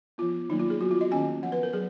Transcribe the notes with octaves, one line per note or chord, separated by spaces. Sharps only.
F3 B3 F4
D#3 F#3 A#3 D#4
F4
G#4
F#3 B3 F#4
F4
D#5
D#3 A#3 C#4 G#5
F3 B3 F#5
B4
A#4
F#3 G#4